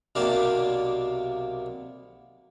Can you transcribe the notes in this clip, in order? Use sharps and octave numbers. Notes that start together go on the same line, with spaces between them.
B1 C3 A#3 D5 F5 A5